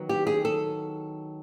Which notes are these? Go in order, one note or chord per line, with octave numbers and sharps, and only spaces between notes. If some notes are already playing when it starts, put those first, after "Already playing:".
Already playing: D#3 F#3 B3
G4
G#4
A4